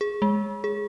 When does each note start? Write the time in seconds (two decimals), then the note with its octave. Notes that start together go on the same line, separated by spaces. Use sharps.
0.01 G#4
0.22 G#3
0.64 G#4